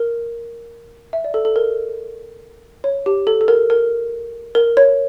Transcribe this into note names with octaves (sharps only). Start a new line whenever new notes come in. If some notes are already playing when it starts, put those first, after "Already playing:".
Already playing: A#4
E5
D5
A4
A4
A#4
C#5
G4
A4
A4
A#4
A#4
A#4
C#5